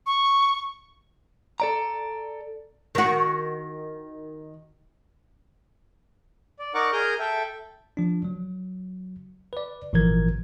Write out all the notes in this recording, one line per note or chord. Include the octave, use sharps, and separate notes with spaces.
C#6
A4 D5 A#5
D#3 F#4
D5
D#4 A#4 D5 F#5 C#6 D6
G#4 A#4 D#6 F6 G6
A4 E5 G5
F3 D4
F#3
B4 D5
G#1 A#2 E3 F3 A#4 G#6